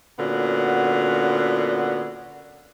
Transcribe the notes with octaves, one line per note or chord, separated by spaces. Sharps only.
A#2 D3 B3 C#4 F#4